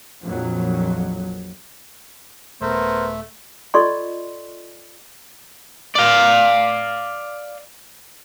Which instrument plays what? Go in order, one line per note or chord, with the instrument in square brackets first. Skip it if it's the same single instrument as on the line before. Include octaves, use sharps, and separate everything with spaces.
[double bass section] A#1 F2 A#2 F#3
[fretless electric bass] D#1 [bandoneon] A3 [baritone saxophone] B3 [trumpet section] A#4 C5
[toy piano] F4 A4 D5 D#5 C6 C#6
[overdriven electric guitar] D5 F5